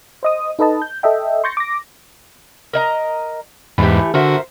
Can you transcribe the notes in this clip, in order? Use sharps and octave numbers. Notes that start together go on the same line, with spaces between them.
C5 D#5 D#6
D#4 A4 B4 D#5 A5
G6
A4 D#5 E5 G5
C6 C#6 G6 A6 A#6 C#7
D6 A#6
A#4 D#5 A#5
E2 G#2 E3 A3 G4
D3 F#4 A#4 C5 E5